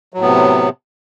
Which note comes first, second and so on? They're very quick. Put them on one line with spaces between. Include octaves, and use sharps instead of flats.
F#3 A2 B3 C3